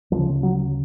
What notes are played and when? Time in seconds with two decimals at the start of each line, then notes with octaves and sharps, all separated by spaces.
0.12 D2 C#3 F3
0.43 F#3